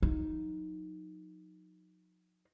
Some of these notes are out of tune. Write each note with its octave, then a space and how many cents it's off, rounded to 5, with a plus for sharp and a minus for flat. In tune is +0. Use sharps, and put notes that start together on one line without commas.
F#3 -45 D#4 +0